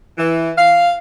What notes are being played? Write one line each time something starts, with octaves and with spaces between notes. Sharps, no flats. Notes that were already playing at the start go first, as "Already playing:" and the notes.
E3
F5